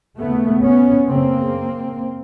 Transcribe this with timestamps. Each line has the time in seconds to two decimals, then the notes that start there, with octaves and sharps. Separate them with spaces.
0.18 D#2 C#3 A3 B3
0.63 B3 C#4
1.08 F#2 C#3 A#3 C4